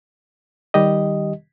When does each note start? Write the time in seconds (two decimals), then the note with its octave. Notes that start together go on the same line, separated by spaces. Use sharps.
0.74 D#3 G3 G4 D#5